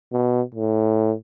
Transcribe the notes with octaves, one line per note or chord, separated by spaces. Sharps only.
B2
A2